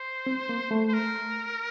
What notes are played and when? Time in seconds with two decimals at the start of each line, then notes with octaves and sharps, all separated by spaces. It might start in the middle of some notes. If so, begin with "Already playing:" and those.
Already playing: C5
0.26 C4
0.49 A#3
0.71 A3
0.88 C5
0.94 A#4